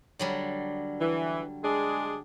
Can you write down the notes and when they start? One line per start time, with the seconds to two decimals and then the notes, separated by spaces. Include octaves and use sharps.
0.19 D3 F#3 G3
1.00 E3
1.64 G#3 D4 G#4